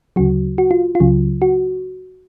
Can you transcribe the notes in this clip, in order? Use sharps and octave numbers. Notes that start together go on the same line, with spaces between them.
D2 C#3 F#3 F#4
F#4
F4
F4
C#2 C#3 F#3
F#4